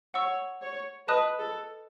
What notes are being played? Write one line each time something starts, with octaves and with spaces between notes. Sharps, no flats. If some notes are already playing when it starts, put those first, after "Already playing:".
C#5 F#5 C#6 E6
C#5
B4 D#5 A5 D#6 F#6
A4